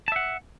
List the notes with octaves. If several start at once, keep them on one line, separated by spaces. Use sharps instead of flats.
E5 F#5 A5